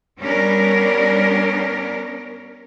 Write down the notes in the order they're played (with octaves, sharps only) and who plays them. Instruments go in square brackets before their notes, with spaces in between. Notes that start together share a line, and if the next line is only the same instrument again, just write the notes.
[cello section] G3 B3 C#4 D4 A#4